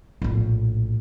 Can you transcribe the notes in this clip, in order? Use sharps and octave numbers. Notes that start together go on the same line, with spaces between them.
A#1 A2